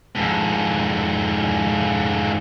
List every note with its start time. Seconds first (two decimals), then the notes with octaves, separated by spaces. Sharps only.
0.15 F2 G#2